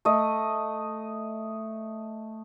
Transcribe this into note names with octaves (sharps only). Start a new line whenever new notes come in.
A3 D#5